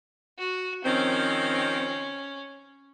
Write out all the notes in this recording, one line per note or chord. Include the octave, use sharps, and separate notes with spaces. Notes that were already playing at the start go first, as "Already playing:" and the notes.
F#4
D#3 F3 C4 C#4